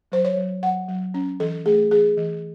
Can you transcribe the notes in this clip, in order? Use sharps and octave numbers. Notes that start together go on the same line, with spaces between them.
F#3 C5
C#5
F#3
F#3 F#5
F#3
C#4
E3 A4
A3 G#4
E3 G#4
E3